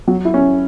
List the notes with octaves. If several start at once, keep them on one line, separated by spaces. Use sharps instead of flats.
F#3
E4
C#4